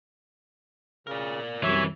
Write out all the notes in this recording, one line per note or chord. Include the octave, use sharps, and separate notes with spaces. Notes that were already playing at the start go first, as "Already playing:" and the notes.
C#3 A#4 D5
C2 F#2 E3 C#5 E5